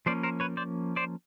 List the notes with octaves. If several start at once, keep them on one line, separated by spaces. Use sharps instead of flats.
F3 A#3 C#4 C5 D5
A#4 C5
B4 C#5
C5 D5
C5 D5